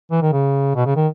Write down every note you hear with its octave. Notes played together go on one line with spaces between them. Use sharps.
E3
D#3
C#3
B2
C#3
D#3